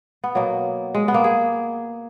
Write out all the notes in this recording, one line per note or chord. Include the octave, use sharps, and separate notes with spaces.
B3
B2 F#3 A#3
G#3
B3
A#3
G#4